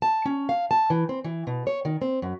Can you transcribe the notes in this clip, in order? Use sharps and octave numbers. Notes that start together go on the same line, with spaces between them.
A5
C#4
F5
A5
E3
C4
E3
B2
C#5
D#3
C4
F#2